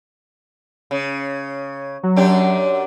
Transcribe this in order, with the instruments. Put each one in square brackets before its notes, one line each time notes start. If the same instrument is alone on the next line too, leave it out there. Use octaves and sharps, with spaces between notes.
[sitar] C#3
[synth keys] F#3
[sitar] F#2 D4 G4